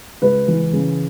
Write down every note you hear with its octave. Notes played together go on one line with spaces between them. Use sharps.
C#2 B4
E3
C#3